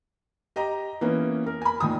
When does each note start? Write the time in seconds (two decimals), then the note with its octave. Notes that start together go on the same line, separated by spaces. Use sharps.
0.56 G4 D#5 A#5
1.01 E3 A#3 B3 C#4
1.46 A#4
1.62 G#5 B5
1.80 A#2 D#3 G#5 D#6